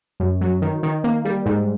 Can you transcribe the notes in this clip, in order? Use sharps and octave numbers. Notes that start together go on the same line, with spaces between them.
F#2
F#3
D#3
D#3
A#3
G3
G#2